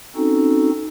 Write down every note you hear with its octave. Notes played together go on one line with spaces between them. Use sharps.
C4 C#4 D#4 F#4 A4